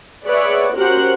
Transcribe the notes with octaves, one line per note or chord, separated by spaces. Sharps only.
G#4 B4 C#5 D5 E5 F#5
C#4 F#4 G4 A#4 C5 F#5